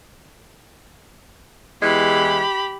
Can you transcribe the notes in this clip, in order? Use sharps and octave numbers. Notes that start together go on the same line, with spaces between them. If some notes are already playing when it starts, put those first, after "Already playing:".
E2 E3 G#3 G4 B5